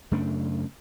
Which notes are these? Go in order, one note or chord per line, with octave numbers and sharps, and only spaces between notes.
F#2 C#3 A3 D4